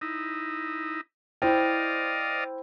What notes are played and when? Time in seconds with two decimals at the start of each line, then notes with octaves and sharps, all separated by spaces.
0.01 D#4 E4
1.42 E4 C5 D5 D#5 F5 G5